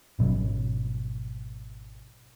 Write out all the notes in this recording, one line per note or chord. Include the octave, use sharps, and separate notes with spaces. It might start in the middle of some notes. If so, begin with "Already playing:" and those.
G#1 B2 F#3